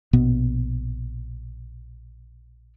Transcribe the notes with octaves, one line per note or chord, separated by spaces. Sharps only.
A#1 B2 B3